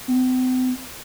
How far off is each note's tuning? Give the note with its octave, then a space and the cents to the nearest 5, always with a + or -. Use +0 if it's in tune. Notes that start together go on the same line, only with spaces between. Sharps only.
C4 -45